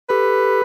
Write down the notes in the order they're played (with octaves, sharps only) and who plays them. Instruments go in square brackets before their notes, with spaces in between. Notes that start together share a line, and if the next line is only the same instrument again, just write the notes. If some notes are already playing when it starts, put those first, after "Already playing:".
[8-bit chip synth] G4 A4 [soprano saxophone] B4